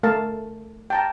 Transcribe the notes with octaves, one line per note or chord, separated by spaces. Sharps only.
A3 A#4 F5 A5
G5 A5 A#5